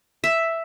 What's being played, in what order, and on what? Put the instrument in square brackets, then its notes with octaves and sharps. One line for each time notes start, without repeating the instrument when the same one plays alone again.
[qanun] E5